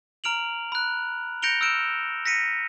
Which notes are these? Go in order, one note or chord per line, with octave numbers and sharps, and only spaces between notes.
A#5 F6 D7 F7 F#7
B5 F#6
G6 A#6 C#7 D7 F7 G7
E6 F6 G6 D7 E7
A#6 B6 C#7 D#7